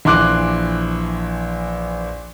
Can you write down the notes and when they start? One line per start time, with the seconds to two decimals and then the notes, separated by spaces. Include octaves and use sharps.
0.05 A#1 E3 C6 D6 F#6